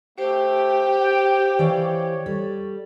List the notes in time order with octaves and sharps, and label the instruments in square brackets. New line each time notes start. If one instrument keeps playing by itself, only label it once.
[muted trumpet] A3 [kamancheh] G4 [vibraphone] C5
[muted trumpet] G5
[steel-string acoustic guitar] E3 D5 F5 [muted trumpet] C#5
[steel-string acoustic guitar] G3 [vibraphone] A4